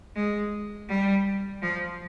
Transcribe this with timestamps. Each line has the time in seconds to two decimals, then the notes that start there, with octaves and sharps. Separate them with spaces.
0.15 G#3
0.89 G3
1.62 F3